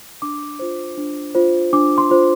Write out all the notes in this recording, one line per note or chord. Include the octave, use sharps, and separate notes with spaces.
D4 D6
F4 C5
D4
F4 C5
D4 D6
C6
F4 C5